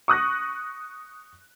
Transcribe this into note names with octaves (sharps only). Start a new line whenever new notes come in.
C#6 D#6 F#6 A#6